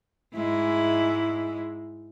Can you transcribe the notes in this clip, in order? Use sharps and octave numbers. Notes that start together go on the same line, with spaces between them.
G#2 G#3 E4